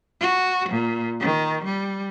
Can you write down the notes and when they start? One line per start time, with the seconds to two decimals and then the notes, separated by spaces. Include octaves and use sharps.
0.20 F#4
0.69 A#2
1.20 D#3
1.64 G3